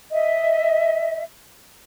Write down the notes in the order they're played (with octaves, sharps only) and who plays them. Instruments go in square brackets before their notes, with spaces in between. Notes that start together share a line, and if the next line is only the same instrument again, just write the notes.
[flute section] D#5 E5